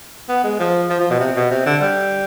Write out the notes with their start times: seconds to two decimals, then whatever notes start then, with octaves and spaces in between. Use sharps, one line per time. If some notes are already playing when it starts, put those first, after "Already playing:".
0.29 B3
0.44 G#3
0.60 F3
0.90 F3
1.00 F3
1.10 B2
1.20 C3
1.36 B2
1.51 C3
1.66 D3
1.81 G3